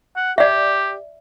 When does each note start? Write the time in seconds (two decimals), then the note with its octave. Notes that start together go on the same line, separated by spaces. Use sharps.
0.16 F#5
0.38 G4 D5 E5